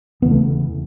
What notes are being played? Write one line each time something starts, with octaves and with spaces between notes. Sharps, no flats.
E1 E2 C#3 B3
A3